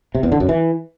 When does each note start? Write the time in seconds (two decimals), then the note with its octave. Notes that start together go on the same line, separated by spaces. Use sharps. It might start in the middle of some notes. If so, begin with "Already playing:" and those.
0.15 C3
0.23 E2
0.32 D3
0.40 F#2
0.49 E3